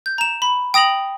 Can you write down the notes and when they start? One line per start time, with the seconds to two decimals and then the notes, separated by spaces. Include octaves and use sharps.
0.06 G6
0.18 A#5 E7
0.42 B5
0.74 G5 D#6 A#6 F7 F#7